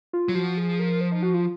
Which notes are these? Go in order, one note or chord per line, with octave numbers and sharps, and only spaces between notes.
F4
F#3
F3 F#4
G#4
A#4
C5
D#4
F#4
F4